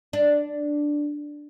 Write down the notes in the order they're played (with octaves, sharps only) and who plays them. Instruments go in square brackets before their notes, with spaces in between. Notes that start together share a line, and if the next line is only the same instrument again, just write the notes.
[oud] D4